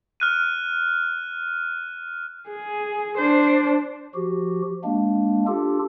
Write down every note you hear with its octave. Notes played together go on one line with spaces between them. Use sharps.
F6 F#6 D#7
G#4
D4 C5
F3 F#4 G4
G#3 A#3 D4
D4 F4 G4 A4